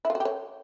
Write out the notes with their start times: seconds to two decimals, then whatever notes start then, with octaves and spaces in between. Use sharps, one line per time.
0.05 E4
0.10 F4
0.15 F#4
0.20 G4
0.25 C#5